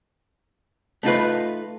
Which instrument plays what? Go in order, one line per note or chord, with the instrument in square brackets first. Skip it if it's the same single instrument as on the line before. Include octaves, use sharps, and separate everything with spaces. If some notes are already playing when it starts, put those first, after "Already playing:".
[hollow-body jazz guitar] A3 D#4 F4 B4